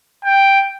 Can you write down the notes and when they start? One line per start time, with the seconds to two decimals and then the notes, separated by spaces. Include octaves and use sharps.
0.25 G5